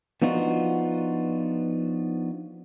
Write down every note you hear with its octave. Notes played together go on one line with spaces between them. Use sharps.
F3 B3 D4 D#4 F4 F#4